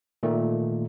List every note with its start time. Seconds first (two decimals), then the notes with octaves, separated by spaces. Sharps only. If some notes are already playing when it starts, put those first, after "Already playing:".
0.23 A#2 D#3 A3